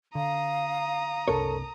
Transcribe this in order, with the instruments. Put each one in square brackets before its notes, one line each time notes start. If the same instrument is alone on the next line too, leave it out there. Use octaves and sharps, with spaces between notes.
[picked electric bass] D3 [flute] F5 [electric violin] A#5 D#6
[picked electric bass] F#1 C2 D4 [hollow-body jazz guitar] A4 A#4 C#5